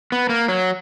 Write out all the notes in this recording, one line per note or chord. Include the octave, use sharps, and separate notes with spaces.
B3
A#3
F#3